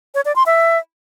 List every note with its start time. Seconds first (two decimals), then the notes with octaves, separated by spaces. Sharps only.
0.15 C#5
0.25 D5
0.36 C6
0.46 E5